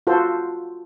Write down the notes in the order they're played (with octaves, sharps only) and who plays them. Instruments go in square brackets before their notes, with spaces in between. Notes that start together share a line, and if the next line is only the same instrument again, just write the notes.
[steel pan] F4 F#4 A4 C5